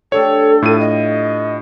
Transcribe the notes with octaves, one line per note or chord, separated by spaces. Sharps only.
A3 D4 G4 A4 C#5
A2 E4 F4 D#7
D#5